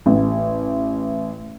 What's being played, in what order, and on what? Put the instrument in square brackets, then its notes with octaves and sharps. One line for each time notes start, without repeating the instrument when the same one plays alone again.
[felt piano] A1